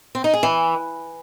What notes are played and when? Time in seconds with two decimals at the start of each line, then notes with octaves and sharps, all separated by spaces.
0.15 C4
0.24 D#4
0.33 G#4
0.43 E3